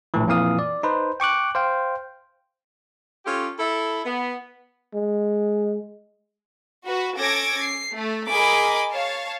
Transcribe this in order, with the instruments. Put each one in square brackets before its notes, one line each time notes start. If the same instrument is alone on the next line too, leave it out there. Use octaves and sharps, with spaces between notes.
[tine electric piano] A#1 A2 E3
F2 A#2 E3 F5 D#6
D5
D#4 B4 C5
G5 C#6 D6 F#6
C5 F5 G5
[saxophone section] C#4 F4 G4 A4
E4 A4
B3
[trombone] G#3
[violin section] F#4 B4
C#4 A4 D6 G#6 A#6 D7
C7
A3
G#4 A#4 D#5 G#5 B5 D6
C#5 F5 A5